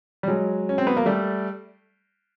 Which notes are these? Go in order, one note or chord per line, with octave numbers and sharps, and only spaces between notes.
G3
F#3 G#3
C#4
C4
B3
A#3
G3 A3